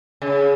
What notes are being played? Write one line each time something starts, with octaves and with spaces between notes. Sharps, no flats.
C#3